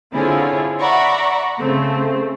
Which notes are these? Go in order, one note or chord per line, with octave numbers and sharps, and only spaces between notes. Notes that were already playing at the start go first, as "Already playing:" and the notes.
D3 C4 E4 F4 G#4 C#5
D5 E5 F#5 A#5 B5 C#6
C#3 A3 C4